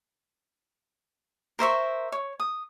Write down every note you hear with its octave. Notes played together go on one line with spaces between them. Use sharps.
A#4 C5 E5 C#6
C#5
D#6